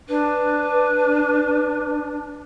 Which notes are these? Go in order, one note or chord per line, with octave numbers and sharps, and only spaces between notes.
D4 B4